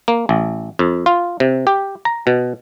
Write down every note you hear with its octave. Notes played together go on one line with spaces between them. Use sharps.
A#3
A1
F2
F4
C3
G4
A#5
B2